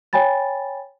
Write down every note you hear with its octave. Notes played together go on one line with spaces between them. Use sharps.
C#5 G5 G#5 B5 A6